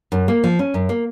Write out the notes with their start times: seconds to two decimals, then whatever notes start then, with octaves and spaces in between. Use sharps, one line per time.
0.12 F#2
0.28 A#3
0.44 F3
0.59 C#4
0.74 F#2
0.89 A#3